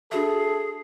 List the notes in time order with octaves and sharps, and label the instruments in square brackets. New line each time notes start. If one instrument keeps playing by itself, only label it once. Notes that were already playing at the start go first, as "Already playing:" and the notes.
[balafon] D4 F#4 E5 [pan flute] G#4 [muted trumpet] A4